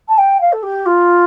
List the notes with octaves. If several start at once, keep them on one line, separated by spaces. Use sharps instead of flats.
A5
G5
F5
A4
G4
F4